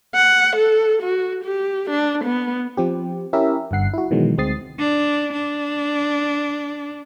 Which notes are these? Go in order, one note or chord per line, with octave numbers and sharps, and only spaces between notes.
F#5
A4
F#4
G4
D4
B3
F3 C4 G4
C#4 E4 G4 A#4 E5
G1 G2 F#5 C7
E4 F#4
B2 D#3 E3 F#3 G#3
D2 G#3 C4 D#6 A6 C7
D4
D4